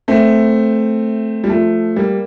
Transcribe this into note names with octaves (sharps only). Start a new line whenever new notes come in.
A3 C4
G3
F3 A3
G3 A#3